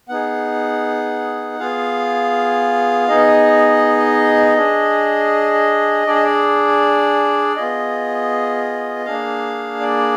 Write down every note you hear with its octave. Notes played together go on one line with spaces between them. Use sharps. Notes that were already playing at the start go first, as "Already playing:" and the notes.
B3 D#4 G#4 F#5
B3 F4 G#4 F5
B3 D#4 G#4 D#5
D4 G#4
D4 G#4 D5
D#5
D5
B3 F4 G#4 D#5
A#3 D4 G#4 F5
D5